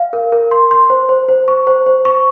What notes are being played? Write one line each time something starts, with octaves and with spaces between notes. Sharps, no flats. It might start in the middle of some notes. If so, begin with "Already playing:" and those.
Already playing: F5
A#4
A#4
C6
C6
C5
C5
C5
C#6
C5
C5
C#6